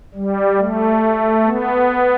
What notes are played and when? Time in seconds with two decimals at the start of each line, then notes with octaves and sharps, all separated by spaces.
0.14 G3
0.58 A3
1.45 B3